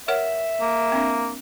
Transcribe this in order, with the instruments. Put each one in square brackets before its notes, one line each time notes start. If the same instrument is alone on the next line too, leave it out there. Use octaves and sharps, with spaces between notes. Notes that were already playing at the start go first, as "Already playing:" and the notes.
[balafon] A#4 C#5 F#5 [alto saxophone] E5
[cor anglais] A#3
[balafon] C4 D4